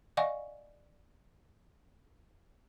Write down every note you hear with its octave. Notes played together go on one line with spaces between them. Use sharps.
D5 D#5 F5 F#5 G#5 C#6